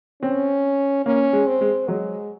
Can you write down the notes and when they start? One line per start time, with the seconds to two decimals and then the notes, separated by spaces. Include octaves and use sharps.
0.22 C4 C#4
1.05 A#3 C#4
1.33 G#3
1.47 C4
1.61 G#3
1.88 F#3 G#3